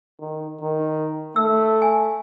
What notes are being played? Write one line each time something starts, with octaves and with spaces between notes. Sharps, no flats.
D#3
D#3
A3 E6
G#5